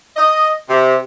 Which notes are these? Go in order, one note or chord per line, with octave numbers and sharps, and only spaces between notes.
D#5
C3